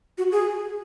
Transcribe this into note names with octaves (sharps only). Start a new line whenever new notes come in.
F#4
G#4